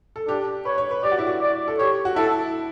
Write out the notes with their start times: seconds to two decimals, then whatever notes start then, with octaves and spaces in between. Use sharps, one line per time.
0.16 A4
0.28 D4 G4
0.65 B4 C#5
0.78 C#5
0.91 B4
1.03 G4 D5
1.11 F#4
1.19 E4
1.27 F#4
1.41 D5
1.68 A4
1.79 G4 C#5
2.05 F#4
2.16 E4 A4